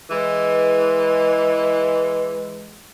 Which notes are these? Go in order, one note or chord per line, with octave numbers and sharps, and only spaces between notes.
E3 G#3